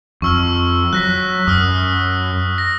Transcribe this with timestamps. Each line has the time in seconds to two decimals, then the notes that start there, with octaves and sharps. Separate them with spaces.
0.22 F2 C#6 E6 F6
0.93 F#3 F#6 A#6 B6
1.47 F#2 D#6 F6
2.58 A#6